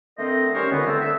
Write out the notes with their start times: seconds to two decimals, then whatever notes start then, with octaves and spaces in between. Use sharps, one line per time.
0.17 D3 A3 C4 A#4 C5 D#5
0.53 D#3 G3 C#4 A#4 C5 C#5
0.70 C#2 D3 B3
0.86 A3 C4
1.00 D3 E5